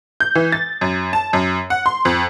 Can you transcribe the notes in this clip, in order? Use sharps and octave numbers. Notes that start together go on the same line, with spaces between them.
G6
E3
A6
F#2
A5
F#2
F#5
C6
F2